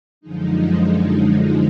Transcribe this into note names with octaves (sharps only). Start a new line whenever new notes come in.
F#2 D3 F3 G#3 D#4